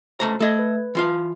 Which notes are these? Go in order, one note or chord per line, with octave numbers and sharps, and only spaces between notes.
C#2 A3 C5 A#5
A3 A4 D#5 G#6
B4
E3 F4 F5